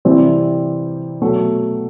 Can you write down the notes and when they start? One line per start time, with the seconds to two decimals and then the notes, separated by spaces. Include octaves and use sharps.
0.05 C3 E3 G3 C4
1.21 B2 F#3 A3